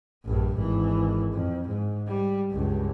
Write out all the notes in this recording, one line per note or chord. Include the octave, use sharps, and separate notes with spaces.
A#1 G2
G#1 E3
F2
G#2
G3
C#2 G2